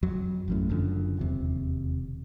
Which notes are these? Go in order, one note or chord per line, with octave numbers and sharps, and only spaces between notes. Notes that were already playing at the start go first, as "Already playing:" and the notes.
F2 F#3
A1 F#2 A2
F#1 F#2 D3 F3
E1 D#2 C3